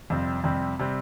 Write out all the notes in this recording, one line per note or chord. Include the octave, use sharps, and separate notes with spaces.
F2 C3 G3 C4
F2 C3 G3 C4
C3 G3 C4